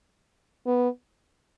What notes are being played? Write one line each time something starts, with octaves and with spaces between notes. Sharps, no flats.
B3